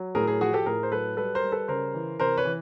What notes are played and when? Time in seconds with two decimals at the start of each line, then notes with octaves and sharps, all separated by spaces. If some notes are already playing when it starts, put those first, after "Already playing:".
Already playing: F#3
0.15 A2 G#4 A#4
0.27 G#4 A#4
0.41 F3 F#4 G#4
0.53 G4 A4
0.66 A2 G#4 A#4
0.83 C5
0.92 F#3 A4 B4
1.17 G3 A4 B4
1.35 A#4 C5
1.44 G3
1.52 A4 B4
1.68 C#3 A#4 C5
1.94 E3
2.20 C3 A#4 C5
2.37 B4 C#5
2.45 E3